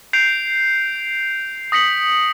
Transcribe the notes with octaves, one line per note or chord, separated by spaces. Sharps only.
G6 C7 D7 F7
D#6 A#6 B6 C#7 F#7